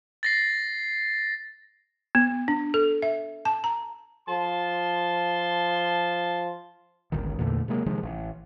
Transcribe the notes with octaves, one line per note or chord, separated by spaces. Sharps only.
A6 A#6 C7
B3
D4
A4
E5
A5
A#5
F3 A5 C6
G1 C#2 D#3
E2 A#2 D3 A3
C3 F#3 G#3 A#3
C3 D#3 F3 G#3
A1